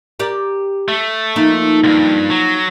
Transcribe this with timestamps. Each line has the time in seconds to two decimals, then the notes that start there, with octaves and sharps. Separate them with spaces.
0.19 G4 A#4 D5
0.88 A3
1.36 F3 A#3 D#4
1.84 C2 G2
2.30 F#3